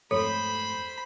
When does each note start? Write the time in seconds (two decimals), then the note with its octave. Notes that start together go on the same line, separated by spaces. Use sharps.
0.11 F2 G#2 A3 A4 C5 C#5 B5